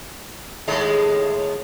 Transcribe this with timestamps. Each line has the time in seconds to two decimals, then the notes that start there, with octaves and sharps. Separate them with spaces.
0.68 D#2 A2 G#3